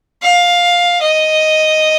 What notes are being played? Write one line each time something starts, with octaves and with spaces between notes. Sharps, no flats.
F5
D#5